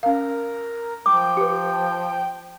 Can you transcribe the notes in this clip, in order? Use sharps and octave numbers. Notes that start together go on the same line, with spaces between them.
C#4 A#4 F5
F3 G5 D6
G4 B4